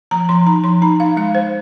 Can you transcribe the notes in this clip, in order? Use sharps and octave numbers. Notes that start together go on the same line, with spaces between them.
F3 A#5
F3 C6
D#4 A#5
F3 C6
D#4 A#5
D#4 F5
G#3 F5
G#3 C5